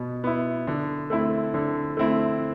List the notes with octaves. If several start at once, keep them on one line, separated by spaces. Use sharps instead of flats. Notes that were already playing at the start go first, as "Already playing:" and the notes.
Already playing: B2 B3
B3 E4
D3
A3 C4 E4
D3
A3 C4 E4